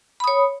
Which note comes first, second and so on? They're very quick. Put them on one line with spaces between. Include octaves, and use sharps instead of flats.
B5 D#6 C#5